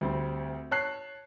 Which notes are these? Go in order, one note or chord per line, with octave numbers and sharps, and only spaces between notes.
D2 G3 C4
C#5 A5 F#6 C7